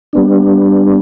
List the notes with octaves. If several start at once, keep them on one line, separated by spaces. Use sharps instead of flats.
G3 B3 D4